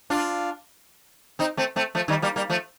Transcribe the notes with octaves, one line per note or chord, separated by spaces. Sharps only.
D4 F4
C4 D#4
A3 C4
A3 C4
F3 A3
D#3 G3
G3 A#3
G3 A#3
F3 A3